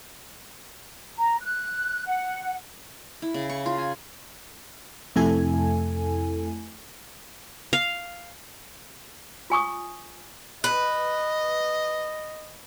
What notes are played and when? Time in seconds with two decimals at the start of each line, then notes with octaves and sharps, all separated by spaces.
1.18 A#5
1.40 F#6
2.08 F#5
3.22 E4
3.34 C#3
3.49 C#6
3.66 F4
3.78 G#5
5.16 F2 C3 A3 E4 A4 G#5
7.73 F5
9.50 F4 G#5 C#6 D#6
10.64 B4 D#5